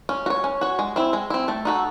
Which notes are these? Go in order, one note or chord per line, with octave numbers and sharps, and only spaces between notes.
C#4
F#4
C#5
C#4
F#4 C#5
G#3
C4 E4
G#3
C4 E4
A3
D#4 F#4 A4